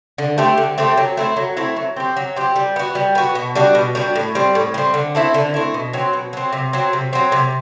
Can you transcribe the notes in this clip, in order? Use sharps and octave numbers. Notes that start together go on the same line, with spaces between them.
D3
A3 C4 G4
D3
A3 C4 G4
F#3
A3 C4 E4
F#3
A3 C4 E4
F#3
C4 G4
F#3
C4 G4
G3
B3 F#4
G3
B3 F#4
B2
G3 D4 F#4
B2
G3 D4 F#4
A2
G3 C4
A2
G3 C4
D3
A3 C4 E4
D3
A3 C4 E4
B2
F#3 C4
B2
F#3 C4
C3
F#3 C4
C3
F#3 C4
C3